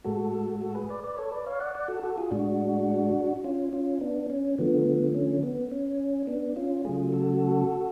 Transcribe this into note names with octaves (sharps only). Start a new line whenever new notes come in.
A2 G#3 F#4 A4
F#4 A4
G#4 B4
B4 D5
B4 D5
A4 C#5
B4 D5
C#5 F5
D5 F#5
D5 F#5
F#4 A4
F#4 A4
F4 G#4
A2 G#3 D4 F#4
C#4 F4
C#4 F4
B3 D4
C#4
D3 F3 A3 B3
C#4
B3
C#4
B3 D4
C#4 F4
C#3 F#3 A3 F4 G#4
F#4 A4